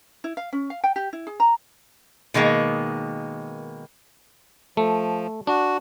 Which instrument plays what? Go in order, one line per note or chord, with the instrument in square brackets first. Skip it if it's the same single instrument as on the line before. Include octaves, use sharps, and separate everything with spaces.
[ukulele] E4
F5
C#4
F5
G5
G4
E4
G#4
A#5
[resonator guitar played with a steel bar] B2 D#3 G#3 A#3
[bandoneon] F3 [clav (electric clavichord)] A3
[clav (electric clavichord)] D4 [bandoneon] F#4